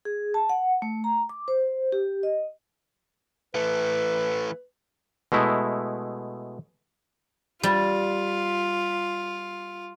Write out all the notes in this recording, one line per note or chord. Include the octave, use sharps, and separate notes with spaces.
G#4
A5
F#5
A3
A#5
D6
C5
G4
D#5
E3 A3 B4
B2 G#3 A3 E4
G3 F4